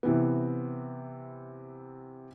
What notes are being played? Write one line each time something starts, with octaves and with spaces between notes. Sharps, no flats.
C3 E3 B3